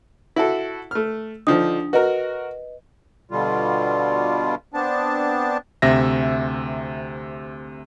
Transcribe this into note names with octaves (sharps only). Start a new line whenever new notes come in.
E4 F#4 A4
A3 F6
D3 F3 D4 D#4 D#6
F#4 A#4 B4 D#5
B2 D3 G3 F4
B3 C4 D4 A5
D2 C3 E5 A#6